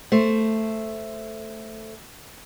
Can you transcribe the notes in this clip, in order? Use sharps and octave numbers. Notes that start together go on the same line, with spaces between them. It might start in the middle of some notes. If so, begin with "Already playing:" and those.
A3 C5